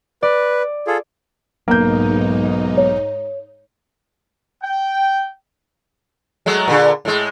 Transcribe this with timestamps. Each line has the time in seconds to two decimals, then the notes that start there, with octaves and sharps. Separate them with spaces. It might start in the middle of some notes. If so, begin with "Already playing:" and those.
0.23 B4 D5
0.87 F4 G#4 A4
1.68 B1 G#2 A#3 D#4 G6
2.77 C#5
4.62 G5
6.46 F#3 G#3 A3
6.68 A#2 D3
7.05 A2 G#3